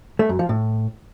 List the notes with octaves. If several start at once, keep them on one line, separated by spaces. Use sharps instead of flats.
A3
F#2
F3
A2